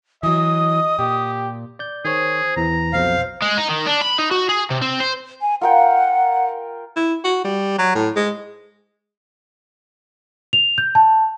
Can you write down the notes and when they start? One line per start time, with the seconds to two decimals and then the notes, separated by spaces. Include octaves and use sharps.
0.23 E3 F#3 D#5 D#6
0.99 A#2 G4
1.79 D5 G6
2.05 D#3 G#4 C5 C#5
2.57 E2 E3 A#5
2.93 B1 F2 B2 C5 F5
3.42 G#3
3.57 D#4
3.69 D#3
3.86 D4
4.01 B5
4.18 D#4
4.31 F#4
4.49 G#4
4.71 C3
4.82 C4
5.00 C5
5.41 G#5
5.61 F4 A#4 F#5 G5
6.96 E4
7.24 F#4
7.44 G3
7.78 F#3
7.95 A2
8.16 G#3
10.53 F7
10.78 G6
10.95 A5